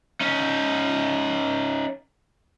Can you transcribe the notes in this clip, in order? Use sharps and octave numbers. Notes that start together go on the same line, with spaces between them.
C#4 D#4